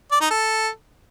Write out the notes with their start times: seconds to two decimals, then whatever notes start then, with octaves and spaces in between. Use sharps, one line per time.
0.12 D5
0.21 D#4
0.30 A4